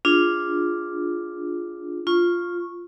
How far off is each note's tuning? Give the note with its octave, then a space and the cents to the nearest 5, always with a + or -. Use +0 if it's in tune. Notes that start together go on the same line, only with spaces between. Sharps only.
D4 +0 F4 +0 G#4 +0
F4 +0 C#6 -10